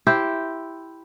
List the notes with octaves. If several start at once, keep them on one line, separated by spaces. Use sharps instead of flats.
E4 G4 C5